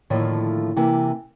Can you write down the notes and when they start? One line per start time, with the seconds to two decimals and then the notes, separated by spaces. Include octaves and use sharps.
0.10 A2 D3 D#3 F3 A3 A#3
0.76 C3 E3 A#3